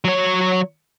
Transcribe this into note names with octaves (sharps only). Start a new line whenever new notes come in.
F#3 C#5